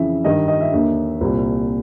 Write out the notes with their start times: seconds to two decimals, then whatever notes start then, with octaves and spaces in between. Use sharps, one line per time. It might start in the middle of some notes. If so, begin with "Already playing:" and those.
Already playing: F2 C#3 E3 E5
0.24 G2 D#3 D#5
0.48 D#5
0.61 E5
0.72 D#2 D3
1.21 C2 A#2